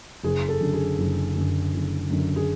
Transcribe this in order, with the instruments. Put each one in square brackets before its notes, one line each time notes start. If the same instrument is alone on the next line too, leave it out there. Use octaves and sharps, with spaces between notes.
[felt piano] F#1 G#4
A4
F#2 D3
G#4
F#1
F#2 D3
F#1
F#2 D3
G#4